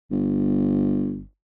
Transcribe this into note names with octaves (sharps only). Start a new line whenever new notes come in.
G1